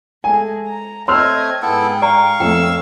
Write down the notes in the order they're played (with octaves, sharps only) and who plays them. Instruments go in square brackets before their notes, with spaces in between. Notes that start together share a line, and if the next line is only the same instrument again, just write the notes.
[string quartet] G#3 A3 G#4 [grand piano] G#5
[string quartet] A#5
[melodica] A3 C4 [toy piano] C#5 [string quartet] D#5 G#6 [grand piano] C6 E6 F6
[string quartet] G#2 G#4 G5 [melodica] B3 E4 A4
[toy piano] D5 A#5 [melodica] F5 C#6
[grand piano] F2 A3 [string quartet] C#5 E6 [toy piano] G5